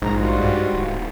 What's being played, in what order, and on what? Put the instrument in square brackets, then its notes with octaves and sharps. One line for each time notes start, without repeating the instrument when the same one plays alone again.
[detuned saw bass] A#1 [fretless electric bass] G#2 [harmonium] A#5
[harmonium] G3 F4 F#4
[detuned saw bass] G2
D1